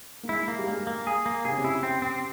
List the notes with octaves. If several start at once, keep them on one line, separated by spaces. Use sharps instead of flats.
A#3
G#3 E4
A#3
G3
G#3 A#3
A#3
G#4
A#3
C3 G#4
C#3
C3
E4
C4
C4